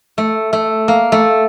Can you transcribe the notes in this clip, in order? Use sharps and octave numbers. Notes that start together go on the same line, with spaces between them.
A3
A3
A#3
A3